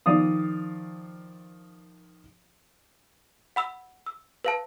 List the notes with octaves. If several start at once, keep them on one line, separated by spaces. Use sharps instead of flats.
D#3 F3 D5 F5 D#6
F#5 B5 E6
E6
B4 F5 A5